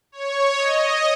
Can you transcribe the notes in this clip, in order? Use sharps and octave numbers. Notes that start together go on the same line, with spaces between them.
C#5
D#5